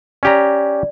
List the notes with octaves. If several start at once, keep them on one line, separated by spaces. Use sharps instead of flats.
C#4 G4 D5 A#5